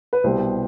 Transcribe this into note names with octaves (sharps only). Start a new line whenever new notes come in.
B4
C2 B2 G3 B3 C5